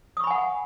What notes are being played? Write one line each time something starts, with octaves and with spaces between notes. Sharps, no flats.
F#5 G#5 B5 C#6 D#6